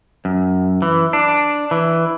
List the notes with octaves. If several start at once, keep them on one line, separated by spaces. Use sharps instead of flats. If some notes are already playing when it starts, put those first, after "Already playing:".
F#2
E3
D4
E3